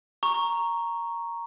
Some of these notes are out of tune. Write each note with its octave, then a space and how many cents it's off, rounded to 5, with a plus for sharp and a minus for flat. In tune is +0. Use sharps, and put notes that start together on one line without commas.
A#5 +0 C#6 +0